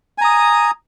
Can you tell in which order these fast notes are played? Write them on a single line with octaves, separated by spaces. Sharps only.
G#5 A#5 D#6